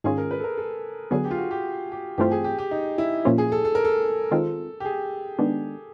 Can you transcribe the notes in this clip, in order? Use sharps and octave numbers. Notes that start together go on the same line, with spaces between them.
G#2 D#3 G#3 C#4 F4 G#4
A#4
B4
A4
A#4
A4
D3 F#3 B3 G#4
G4
F4
F#4
G4
G4
G2 E3 A3 C4 F4 G4
G#4
G4
G4
D#4
E4
A#2 F3 A#3 C#4 F4
G#4
A4
A4
A#4
A4
D#3 G#3 C4 F4
G4
G#4
D#3 G#3 B3 D4